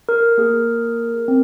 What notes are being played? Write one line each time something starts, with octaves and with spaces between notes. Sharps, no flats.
A#4
A#3 G#4
C4